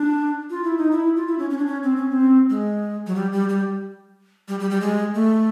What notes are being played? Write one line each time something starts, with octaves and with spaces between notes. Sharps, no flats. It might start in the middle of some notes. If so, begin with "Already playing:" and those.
Already playing: D4
F4
E4
D#4
E4
F4
E4
C#4
C#4
D4
C#4
C4
C#4
C4
G#3
F#3
G3
G3
G3
G3
G3
G3
G#3
A3